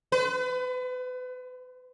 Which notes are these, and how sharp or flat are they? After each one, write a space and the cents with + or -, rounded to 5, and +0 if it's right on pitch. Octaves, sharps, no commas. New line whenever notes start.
B4 +35